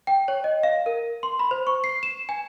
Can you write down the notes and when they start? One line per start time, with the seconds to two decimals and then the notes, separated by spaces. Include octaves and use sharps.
0.07 G5
0.28 C#5
0.44 D#5
0.63 F5
0.86 A#4
1.23 C6
1.39 B5
1.51 C5
1.67 C#6
1.84 C7
2.03 E7
2.29 G#5